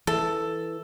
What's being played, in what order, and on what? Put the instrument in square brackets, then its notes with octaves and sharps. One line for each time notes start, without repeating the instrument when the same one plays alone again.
[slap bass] E3 [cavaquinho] A4